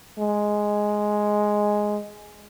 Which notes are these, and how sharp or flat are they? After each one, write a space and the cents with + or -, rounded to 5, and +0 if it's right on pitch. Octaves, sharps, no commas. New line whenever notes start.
G#3 +0